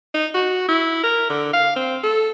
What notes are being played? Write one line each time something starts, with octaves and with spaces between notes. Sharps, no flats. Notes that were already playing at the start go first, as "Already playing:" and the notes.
D#4
F#4
E4
A#4
D3
F5
C4
A4